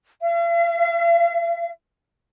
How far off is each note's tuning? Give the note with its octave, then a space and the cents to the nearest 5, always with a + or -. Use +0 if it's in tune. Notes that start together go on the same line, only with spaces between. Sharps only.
F5 -45